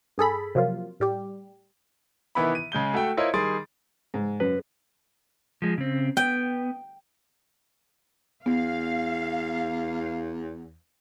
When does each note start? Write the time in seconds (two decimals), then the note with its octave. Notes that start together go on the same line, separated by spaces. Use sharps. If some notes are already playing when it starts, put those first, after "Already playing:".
0.18 G2 G#4 A4 B5
0.55 C3 F3 F#3 A#3 F4
1.00 A2 G3 G4
2.35 C3 D#3 E3 B3 E4 B5
2.55 D#7
2.72 C#3 G#3 G6 G7
2.94 A3 F#4 A4 G5
3.17 E4 F4 A#4 C5 C#5 D#5
3.34 D#3 G3 G#4 C6 A6 D7
4.14 G#2
4.40 F#2 B4
5.62 F3 G#3
5.78 C#3 C4
6.17 B3 G5
8.46 E2 B3 F5